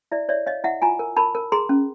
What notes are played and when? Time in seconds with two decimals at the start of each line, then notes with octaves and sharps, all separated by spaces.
0.12 E4 D5 E5
0.29 C#5 D5 E5
0.46 C#5 D#5 F5
0.64 E4 E5 F#5
0.82 F4 G#5 A#5
0.99 A#4
1.17 A#4 A5 B5
1.35 A#4
1.52 G#4 A#5 C6
1.69 C#4